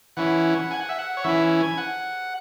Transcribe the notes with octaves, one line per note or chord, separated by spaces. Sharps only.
E3 C#4 E4 F#5
G#5
F#5
E5
F#5
C#5
E3 C#4 E4 E5
G#5
F#5